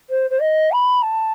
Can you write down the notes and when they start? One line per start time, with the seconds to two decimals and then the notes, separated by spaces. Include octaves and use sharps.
0.10 C5
0.30 C5
0.40 D#5
0.72 B5
1.02 A5